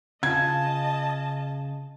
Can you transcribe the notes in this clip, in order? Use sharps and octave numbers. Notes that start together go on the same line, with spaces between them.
C#3 F4 D#5 A5 G#6